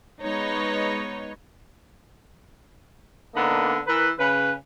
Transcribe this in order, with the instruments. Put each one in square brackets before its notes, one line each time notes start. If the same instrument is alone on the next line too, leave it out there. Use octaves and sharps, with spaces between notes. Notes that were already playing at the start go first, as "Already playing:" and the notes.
[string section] G#3 B3 D#4 C#5
[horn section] D3 A#3 B3 D4 D#4
E3 A#4 B4
C#3 B4